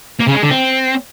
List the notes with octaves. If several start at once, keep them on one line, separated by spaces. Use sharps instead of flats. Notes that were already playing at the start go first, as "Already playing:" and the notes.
A#3
C#3
G#3
D3
C4